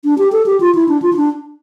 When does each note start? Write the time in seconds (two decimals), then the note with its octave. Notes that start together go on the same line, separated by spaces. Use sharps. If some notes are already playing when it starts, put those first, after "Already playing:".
0.04 D4
0.18 G4
0.32 A4
0.46 G4
0.60 F4
0.75 E4
0.88 D4
1.02 F4
1.13 E4
1.17 D4